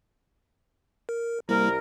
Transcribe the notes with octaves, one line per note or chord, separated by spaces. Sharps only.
A#4
C2 G3 A#3 E4 A#4